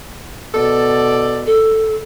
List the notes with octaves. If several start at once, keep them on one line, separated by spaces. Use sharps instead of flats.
B2 A4 D5
A4